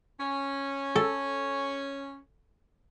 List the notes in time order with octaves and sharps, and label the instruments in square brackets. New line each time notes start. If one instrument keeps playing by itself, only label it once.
[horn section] C#4
[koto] A4